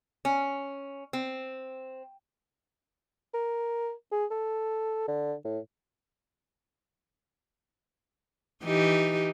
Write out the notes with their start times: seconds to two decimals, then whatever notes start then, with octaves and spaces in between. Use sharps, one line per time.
0.25 C#4
1.13 C4
3.34 A#4
4.12 G#4
4.31 A4
5.08 D3
5.45 A2
8.64 E3 D#4 G4